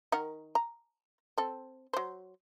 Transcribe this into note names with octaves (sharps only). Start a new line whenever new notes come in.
D#3 A#4 F#5
A#5
C4 A4
F#3 C5